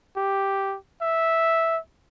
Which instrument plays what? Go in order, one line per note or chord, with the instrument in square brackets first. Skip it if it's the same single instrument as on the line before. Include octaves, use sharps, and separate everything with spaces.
[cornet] G4
E5